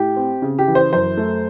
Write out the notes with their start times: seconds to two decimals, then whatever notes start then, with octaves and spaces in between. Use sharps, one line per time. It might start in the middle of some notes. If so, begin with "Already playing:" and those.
Already playing: A2 G4
0.16 C4
0.42 C#3
0.59 G4
0.67 E3
0.75 C5
0.92 F#2 C5
1.17 A3